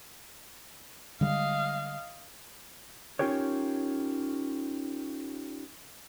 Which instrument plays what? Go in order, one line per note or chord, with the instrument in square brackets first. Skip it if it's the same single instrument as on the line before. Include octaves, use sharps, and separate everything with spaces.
[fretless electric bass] D3 G3 G#3 [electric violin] D#5 F5
[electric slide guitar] C#4 D#4 F4 G4 A#4 C#5